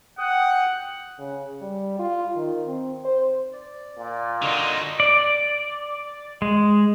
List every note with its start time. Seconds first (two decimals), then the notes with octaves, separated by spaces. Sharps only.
0.19 F#5 G5 D#6 F#6
1.19 C#3
1.62 G3
1.99 F4
2.36 D#3
2.66 C4
3.05 C5
3.53 D5
3.97 A#2
4.43 D3 D#4 F#4 D#5 C6
5.00 D5
6.42 G#3